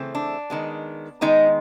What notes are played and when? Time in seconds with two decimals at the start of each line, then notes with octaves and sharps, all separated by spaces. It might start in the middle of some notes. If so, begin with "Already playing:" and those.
Already playing: C#3 E3 A3 C4
0.15 D4
0.50 D#3 G#3 B3
1.21 D#3 G#3 B3 D#4